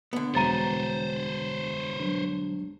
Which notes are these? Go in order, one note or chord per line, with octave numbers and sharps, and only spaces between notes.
D3 B3
E1 G3 C5 C#5 A#5 A6 D#7
F#3 G3 D4